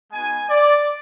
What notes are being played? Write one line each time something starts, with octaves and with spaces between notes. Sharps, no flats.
G#3 B3 D#4 F#4 G#5
D5